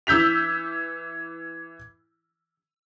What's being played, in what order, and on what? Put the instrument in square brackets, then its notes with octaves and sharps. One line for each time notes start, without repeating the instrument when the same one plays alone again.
[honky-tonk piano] E3 E6 G6 B6 F7